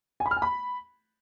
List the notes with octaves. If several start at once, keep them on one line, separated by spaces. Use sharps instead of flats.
G#5
B5
F6
G#5
B5